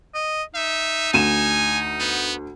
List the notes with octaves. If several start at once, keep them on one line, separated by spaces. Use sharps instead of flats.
D#5
D#4 E5
D2 G#5 D#7 E7
B3